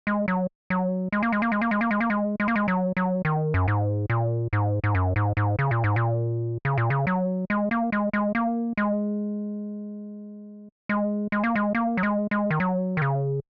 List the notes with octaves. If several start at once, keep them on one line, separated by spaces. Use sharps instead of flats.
G#3
F#3
F#3
G#3
A#3
G#3
A#3
G#3
A#3
G#3
A#3
G#3
A#3
G#3
G#3
A#3
G#3
F#3
F#3
D#3
F#2
G#2
A#2
G#2
G#2
F#2
G#2
G#2
C#3
A#2
G#2
A#2
C#3
A#2
C#3
F#3
G#3
A#3
G#3
G#3
A#3
G#3
G#3
G#3
A#3
G#3
A#3
F#3
G#3
G#3
D#3
F#3
D#3
C#3